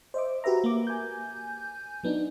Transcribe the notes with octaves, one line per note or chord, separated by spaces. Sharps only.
C5 D#5 E5 D6
F#4 G4 B4 E5 A#5
A#3 D6
G#5 G6
F#3 B3 D4 D#4